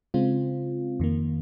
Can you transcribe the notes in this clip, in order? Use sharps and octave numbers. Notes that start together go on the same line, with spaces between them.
C#3 G#3 C4 F4
F2 D#3 A#3